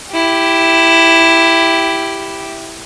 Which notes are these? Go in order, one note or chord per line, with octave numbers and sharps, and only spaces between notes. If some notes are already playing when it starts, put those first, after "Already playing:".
E4 G4